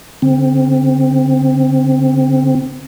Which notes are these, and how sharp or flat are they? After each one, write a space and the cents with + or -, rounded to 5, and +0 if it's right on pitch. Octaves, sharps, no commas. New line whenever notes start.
D3 -45 C4 +0